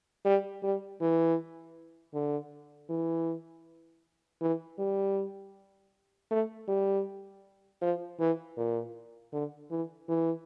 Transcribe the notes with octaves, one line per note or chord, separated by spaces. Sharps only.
G3
G3
E3
D3
E3
E3
G3
A3
G3
F3
E3
A#2
D3
E3
E3